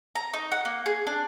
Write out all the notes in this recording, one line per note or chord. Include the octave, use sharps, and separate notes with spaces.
A#5
D#4
F#5
A#3
G#4
D4